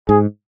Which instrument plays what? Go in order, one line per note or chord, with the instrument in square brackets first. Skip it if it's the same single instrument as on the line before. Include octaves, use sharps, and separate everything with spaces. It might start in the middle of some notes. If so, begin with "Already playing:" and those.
[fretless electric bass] G#2 [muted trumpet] G#4